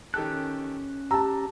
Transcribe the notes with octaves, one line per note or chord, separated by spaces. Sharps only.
D#3 C#4 G4 A4 F#6
G4 A5 A#5 E6